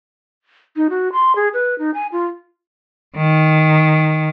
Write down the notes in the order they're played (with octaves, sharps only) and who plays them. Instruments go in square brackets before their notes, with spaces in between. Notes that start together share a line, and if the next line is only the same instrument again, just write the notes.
[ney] D#4
F#4
C6
G#4
B4
D#4
G#5
F4
[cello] D#3